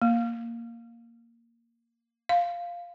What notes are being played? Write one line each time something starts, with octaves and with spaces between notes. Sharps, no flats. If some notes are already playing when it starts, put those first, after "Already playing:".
A#3
F5